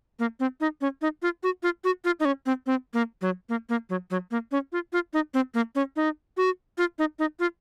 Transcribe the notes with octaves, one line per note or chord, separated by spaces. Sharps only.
A#3
C4
D#4
C#4
D#4
F4
F#4
F4
F#4
F4
D#4
C#4
C4
C4
A#3
F#3
A#3
A#3
F#3
F#3
A#3
C#4
F4
F4
D#4
C4
A#3
C#4
D#4
F#4
F4
D#4
D#4
F4